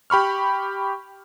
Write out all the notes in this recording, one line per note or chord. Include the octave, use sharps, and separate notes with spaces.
G4 B5 C#6 F6